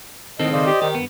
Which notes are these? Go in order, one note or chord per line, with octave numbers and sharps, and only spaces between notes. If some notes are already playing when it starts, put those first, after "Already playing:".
A2 D3 D#3 C4 A4 D#5
C#3 C5 D5 D#5
G4
D#3 G4
G2 B3